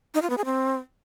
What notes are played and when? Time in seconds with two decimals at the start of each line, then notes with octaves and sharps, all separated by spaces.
0.14 D#4
0.22 F4
0.30 B3
0.38 G#4
0.45 C4